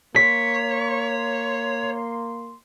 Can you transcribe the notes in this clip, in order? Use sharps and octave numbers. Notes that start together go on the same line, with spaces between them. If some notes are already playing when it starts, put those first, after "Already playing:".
A#3 C#5 C6 B6